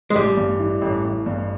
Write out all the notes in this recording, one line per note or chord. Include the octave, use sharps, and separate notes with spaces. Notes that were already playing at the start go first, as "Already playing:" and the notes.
G#3
A1 G3
G2
E3
A1
A1
G2